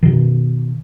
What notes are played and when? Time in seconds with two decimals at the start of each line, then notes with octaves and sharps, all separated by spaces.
0.03 B2 D#3